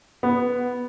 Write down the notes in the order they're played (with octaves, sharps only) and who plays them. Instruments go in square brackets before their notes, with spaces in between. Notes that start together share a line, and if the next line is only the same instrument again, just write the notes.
[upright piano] B3